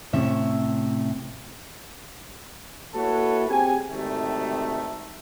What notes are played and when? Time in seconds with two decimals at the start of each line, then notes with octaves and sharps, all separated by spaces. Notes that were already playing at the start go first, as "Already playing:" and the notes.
0.13 A2 C3 C#4 E5
2.95 A#3 E4 F#4 A4 B4 C#5
3.49 C4 G4 G#4 G#5
3.89 G#1 D2 C3 D#3 A3